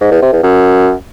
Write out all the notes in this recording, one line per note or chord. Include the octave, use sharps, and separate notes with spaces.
G#2
E2
C3
E2
F#2